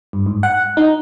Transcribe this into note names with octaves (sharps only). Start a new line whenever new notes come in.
G2
G#2
F#5
D#4